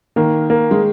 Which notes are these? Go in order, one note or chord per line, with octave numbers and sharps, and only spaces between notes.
D#3 A#3
A#3
G#3